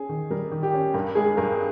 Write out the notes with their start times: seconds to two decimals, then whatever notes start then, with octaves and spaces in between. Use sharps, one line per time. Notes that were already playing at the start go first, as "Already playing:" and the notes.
Already playing: C#4 G#4
0.09 D#3
0.30 G3 A#4
0.51 D#3
0.63 G4
0.74 C#4
0.94 G2 A#4
1.15 G#3 G#4
1.37 G2 A#4